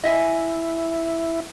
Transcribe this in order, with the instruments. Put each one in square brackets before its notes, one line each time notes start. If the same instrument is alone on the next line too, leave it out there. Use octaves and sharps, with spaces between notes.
[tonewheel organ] E4 [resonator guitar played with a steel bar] D#5 E5 G#5